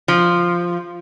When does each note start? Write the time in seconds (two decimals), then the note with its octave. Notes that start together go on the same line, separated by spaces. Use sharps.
0.08 F3